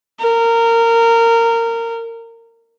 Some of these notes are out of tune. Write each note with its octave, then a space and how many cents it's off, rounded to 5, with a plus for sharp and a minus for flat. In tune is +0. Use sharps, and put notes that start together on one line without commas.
A#4 -20